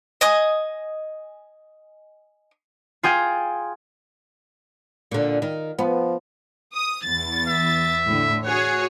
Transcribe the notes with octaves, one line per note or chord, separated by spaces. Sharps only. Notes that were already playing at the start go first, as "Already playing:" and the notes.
D#5 G#5 D#6
F4 G#4 G5
A#2 D3
D#3
F3 B3
D#6
E2 A6
E5
A2 D3
F#4 G#4 C#5 F#5